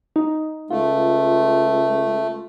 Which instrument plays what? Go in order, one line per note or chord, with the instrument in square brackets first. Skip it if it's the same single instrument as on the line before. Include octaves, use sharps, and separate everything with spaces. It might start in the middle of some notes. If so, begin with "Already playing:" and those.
[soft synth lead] D#4
[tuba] C#2 [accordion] A3 [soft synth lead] F4